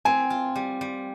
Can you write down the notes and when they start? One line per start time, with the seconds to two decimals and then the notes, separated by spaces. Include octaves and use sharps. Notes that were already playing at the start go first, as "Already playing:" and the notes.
0.05 C4 G#5
0.30 F4
0.56 G3
0.81 G3